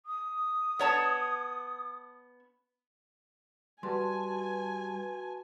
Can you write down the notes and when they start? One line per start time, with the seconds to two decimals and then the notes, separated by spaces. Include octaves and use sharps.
0.06 D#6
0.79 B3 C#5 A5
3.83 G3 F#4 B4 G#5 A5 C6